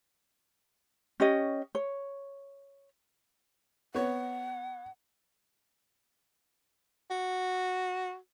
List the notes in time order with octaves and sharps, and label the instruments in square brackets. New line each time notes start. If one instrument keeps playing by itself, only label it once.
[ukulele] C#4 G4 C#5 D#5
C#5
[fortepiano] B3 C#5 [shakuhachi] F#5
[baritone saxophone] F#4